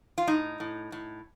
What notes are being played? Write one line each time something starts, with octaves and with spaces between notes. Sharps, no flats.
F4
A2 D#4
A2
A2